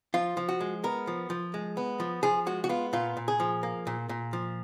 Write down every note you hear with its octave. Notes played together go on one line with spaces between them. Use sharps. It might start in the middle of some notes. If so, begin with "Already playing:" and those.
F3 F4
F3
F#4
G#3
B3 A#4
F3
F3
G#3
B3
F3
F3 G#4
G#3 F#4
F#4
B3 F4
A#2 F4
A#2
G#4
F3
A#3
A#2
A#2
F3